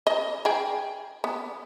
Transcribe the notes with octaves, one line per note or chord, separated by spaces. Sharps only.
D#5
G#4 G5
B3